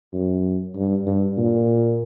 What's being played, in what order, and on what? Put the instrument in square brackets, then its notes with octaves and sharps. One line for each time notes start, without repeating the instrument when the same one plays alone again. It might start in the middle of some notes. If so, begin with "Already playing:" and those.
[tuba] F#2
G2
G2
A#2